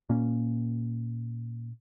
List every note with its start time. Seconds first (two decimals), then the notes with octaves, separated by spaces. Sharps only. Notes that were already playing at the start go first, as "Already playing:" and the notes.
0.09 A#2 A#3 C#4